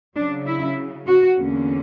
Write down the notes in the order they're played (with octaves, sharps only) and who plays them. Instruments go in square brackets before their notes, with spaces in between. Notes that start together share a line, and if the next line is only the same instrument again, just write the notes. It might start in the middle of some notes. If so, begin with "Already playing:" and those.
[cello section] C#3 F#3 C#4 D4
E4
F#4
E2 D3 A#3 C#4